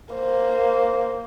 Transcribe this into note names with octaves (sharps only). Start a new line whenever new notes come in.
A#3 C5